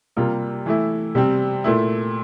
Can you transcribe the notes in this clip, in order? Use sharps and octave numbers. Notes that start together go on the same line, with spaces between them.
C3 G3 A#3 F4
E3 A3 E4
C3 G3 C4
A#2 A3 E4